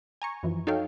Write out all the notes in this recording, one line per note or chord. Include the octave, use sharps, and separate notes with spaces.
G#5 A#5 C#6
F#2 E3 F3
D#4 F#4 A4 C#5 F5 G5